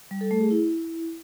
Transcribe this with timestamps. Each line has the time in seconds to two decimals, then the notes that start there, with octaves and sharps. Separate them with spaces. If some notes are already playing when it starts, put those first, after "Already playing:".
0.11 G3
0.21 A4
0.31 A3
0.41 G#4
0.51 E4